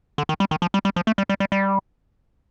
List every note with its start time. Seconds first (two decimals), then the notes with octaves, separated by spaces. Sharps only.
0.18 D3
0.29 D#3
0.40 G3
0.51 D#3
0.62 F3
0.74 G3
0.85 G3
0.96 F3
1.07 A3
1.18 G3
1.29 G3
1.40 G3
1.52 G3